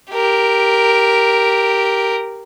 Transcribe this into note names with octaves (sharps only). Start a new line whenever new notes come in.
G4 A#4